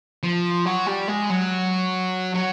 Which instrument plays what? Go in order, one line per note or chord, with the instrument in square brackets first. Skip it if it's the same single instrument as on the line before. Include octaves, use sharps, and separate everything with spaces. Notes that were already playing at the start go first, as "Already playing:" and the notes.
[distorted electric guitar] F3
F#3
G3
G#3
F#3
F#3